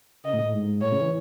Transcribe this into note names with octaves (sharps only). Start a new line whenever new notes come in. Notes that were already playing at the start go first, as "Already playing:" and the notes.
C#3 D#5
A2
A2
G#2
A2 C#5
C#3
E3